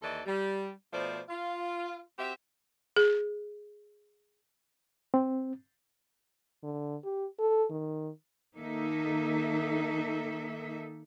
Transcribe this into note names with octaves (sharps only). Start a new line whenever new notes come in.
D#2 E3 A4 D5 D#5
G3
B2 F3 A3 C5 D5
F4
C4 F#4 G4 E5
G#4
C4
D3
G4
A4
D#3
D#3 A#3 D#4 A4 E5